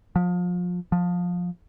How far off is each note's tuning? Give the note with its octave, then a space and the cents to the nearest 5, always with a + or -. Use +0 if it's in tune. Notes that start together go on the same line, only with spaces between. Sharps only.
F3 +30
F3 +20